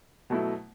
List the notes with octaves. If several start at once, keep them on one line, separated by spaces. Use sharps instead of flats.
B2 F#3 A3 E4